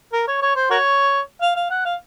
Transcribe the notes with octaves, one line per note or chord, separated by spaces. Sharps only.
A#4
C#5
C#5
C5
F#4 A#4 C#5
F5
F5
F#5
F5